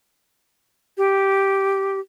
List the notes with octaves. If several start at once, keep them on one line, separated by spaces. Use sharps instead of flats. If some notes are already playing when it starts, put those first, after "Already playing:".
G4